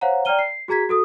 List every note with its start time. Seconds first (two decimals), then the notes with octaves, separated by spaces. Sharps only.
0.01 C5 C#5 F5 F#5 A#5
0.25 D5 G5 A#5 F6 D#7 G7
0.39 C7
0.68 F#4 G#4 A#5 G#6 B6
0.89 F#4 A4 D#6